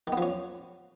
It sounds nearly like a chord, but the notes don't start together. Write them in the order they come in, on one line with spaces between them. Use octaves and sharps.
D#3 B3 F3 C#4